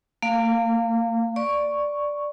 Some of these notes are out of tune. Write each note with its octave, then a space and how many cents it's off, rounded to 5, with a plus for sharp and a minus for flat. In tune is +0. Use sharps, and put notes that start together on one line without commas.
A#3 -40 F5 +0
D5 +0 C#6 +0